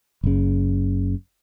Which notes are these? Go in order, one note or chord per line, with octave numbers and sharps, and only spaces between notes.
F#1 C#3